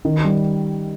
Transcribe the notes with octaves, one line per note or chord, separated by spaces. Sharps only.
D#3
G3